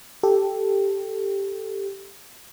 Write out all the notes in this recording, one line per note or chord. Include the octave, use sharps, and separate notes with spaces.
G4 A4